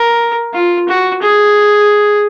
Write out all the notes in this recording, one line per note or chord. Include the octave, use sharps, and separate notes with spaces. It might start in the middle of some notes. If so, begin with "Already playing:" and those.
Already playing: A#4
F4
F#4
G#4